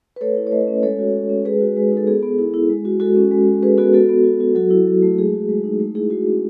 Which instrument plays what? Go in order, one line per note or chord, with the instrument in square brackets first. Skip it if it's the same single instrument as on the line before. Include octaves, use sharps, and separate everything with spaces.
[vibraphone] B4
A3 A4 C#5
E4
C#5
A3 B4 D#5
C#4
G#3 A4 C#5
F#4
G#3
C#4
G#3 G#4 B4
F#4
G#3
D#4
A4
B3 G#4
B3
E4
E4
G#3
F#4
G#3 F#4 A4
C#4
G#3
F#4
G#3 G#4 B4
B3 F#4 A4
B3 F#4 A4
B3
F#4
F#4
F#3 F#4 A4
E4
F#3
A3
G#3 G#4
F#4
G#3
D#4
A3
E4 G#4
A3 F#4
C#4